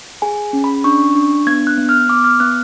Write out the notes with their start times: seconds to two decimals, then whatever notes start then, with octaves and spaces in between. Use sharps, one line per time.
0.22 G#4 G#5
0.53 C#4
0.64 B5
0.84 D4 C#6
1.15 D4
1.47 B3 G#6
1.67 F#6
1.78 B3
1.89 F6
2.09 B3 D6
2.24 F6
2.40 B3 F#6